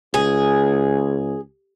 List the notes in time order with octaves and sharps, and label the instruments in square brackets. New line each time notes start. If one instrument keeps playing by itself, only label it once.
[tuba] C#2 [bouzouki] G#4